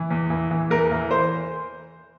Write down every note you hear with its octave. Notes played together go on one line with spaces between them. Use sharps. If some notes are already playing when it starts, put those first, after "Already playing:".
Already playing: E3
E2
E3
E3
E2 A#4
E3
C5